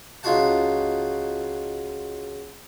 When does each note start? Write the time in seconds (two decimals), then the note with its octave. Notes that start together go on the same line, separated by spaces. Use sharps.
0.23 C#2 D#4 F4 F#4 F#5 A5